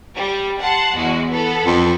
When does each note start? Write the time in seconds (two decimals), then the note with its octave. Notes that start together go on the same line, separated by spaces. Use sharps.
0.15 G3
0.60 F#5 A5 C6
0.96 E2 G#3 F#4
1.29 B3 A4
1.66 F2